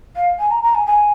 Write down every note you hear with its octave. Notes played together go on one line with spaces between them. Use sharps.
F5
G#5
A#5
A#5
G#5
G#5